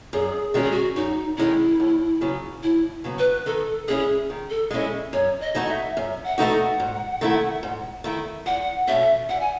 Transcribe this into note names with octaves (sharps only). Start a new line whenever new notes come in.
F#2 G#4
D#3 G#3 C#4 F#4
G#4
F#4
F#2 D#4
D#3 G#3 C#4 E4
D#2
C#3 F#3 B3
D#2 E4
C#3 F#3 B3
B4
D#3 A4
G#3 C#4 E4 G#4
D#3
A4
G#3 C#4 E4 D#5
F#2 C#5
D#5
E3 A3 D#4 F#4
E5
F#2 E5
F#5
E3 A3 D#4 F#4
F#5
G#2
D#3 A3 E4
G#2
D#3 A3 E4
E2 F#5
B2 A3 C#4 E5
E2 F#5
G#5